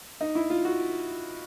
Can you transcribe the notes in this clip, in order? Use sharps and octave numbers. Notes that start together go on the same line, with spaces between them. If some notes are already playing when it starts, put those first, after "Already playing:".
D#4
E4
F4
F#4